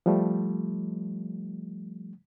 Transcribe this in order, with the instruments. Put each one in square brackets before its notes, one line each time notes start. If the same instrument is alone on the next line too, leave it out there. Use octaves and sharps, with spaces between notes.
[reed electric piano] F3 G3 A3